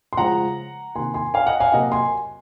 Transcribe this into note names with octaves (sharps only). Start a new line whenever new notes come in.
C6
C#3 F3 G#3 F#5 A#5
C3 D#3 A#3 G#5 C6
G#5 C6
F5 G#5
D#5 F#5
F5 G#5
C3 F#3 A#3 D#5 F#5
G#5 C6